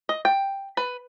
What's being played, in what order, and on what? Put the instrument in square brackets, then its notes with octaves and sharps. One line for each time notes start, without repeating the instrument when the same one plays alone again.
[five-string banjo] D#5
G5
B4